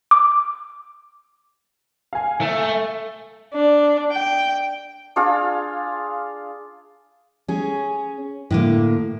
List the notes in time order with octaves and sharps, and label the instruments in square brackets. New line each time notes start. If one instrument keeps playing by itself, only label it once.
[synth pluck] D6
[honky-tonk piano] F5 G#5
[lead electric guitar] A3
[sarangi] D4
G5
[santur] D4 F4 G#4 F5
[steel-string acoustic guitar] C#4 G#4
A2 D3 A#3